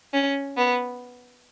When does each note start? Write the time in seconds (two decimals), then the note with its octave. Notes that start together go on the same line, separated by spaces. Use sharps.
0.13 C#4
0.57 B3